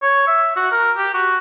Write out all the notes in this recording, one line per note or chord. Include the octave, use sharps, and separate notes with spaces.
C#5
E5
F#4
A#4
G4
F#4